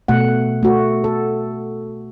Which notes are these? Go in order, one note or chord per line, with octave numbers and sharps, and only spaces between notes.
B2 A3 F#5
A3 F#4
A4